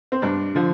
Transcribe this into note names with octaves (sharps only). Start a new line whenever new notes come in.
C4
G2 D4
D3 F3